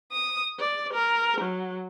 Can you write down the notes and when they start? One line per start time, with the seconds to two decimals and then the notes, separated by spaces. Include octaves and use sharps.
0.12 D#6
0.59 D5
0.93 A#4
1.40 F#3